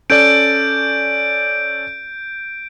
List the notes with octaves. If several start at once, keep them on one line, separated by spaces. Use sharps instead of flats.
C#4 A4 D5 G6 D7